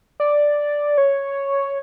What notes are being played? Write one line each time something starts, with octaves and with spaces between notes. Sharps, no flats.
D5
C#5